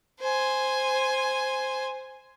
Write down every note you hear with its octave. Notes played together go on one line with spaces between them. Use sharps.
C5 G#5